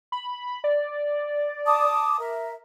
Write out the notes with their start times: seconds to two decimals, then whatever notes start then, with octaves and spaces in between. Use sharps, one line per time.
0.12 B5
0.64 D5
1.66 A5 D6 D#6
2.19 A#4 E5